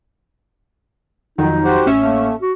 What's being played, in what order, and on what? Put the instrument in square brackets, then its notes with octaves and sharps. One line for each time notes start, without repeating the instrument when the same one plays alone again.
[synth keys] F2 D#3 F#3 [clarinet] D#4
[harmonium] F#4 G4 C5
[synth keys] A1 C#4 E5
[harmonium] A3 [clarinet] A#3
[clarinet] F#4